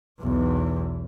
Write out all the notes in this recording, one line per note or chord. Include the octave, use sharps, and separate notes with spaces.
B1 E2